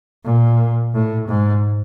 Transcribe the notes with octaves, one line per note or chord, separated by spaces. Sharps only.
A#2
A2
G#2